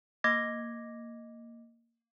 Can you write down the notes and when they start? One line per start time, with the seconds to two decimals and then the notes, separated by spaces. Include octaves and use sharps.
0.24 A#3 D#5 D6 G#6 A#6